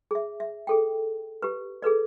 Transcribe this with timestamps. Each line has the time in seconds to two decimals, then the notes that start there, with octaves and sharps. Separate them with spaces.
0.11 G#4 E5
0.40 E5
0.67 G#4 A4 G5
1.42 G4 B4
1.82 G#4 A4 B4 D5